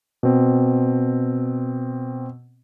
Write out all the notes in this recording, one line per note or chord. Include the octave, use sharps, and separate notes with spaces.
B2 C4